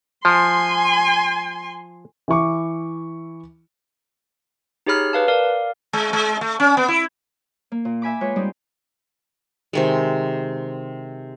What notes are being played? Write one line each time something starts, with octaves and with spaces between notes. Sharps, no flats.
F3 G#5 C6
E3 E4 C#6 D6
D#4 G4 G#4 C#5 B5 F6
B4 F5 A5
A#4 D5 F5
G#3
G#3
A3
C#4
B3
E4
A#3
A#2
E5 G#5 B5 D6
G#3 F4 B4 C#5
G3 G#3 C4 D#4 G4
C3 D#3 G#3